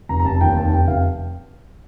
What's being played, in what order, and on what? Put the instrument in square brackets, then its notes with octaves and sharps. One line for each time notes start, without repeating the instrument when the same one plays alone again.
[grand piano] F1 A#5
A#5
F1 A5
D#2 G5
F1 A5
F1 G5
F1 F5